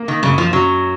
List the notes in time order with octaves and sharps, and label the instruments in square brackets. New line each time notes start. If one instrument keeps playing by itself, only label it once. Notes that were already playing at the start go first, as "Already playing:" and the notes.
Already playing: [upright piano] A#3
[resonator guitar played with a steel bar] D#3
[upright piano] F#2 [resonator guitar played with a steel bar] C#3
[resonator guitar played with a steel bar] F3
[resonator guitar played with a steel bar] F#3 [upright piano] C#4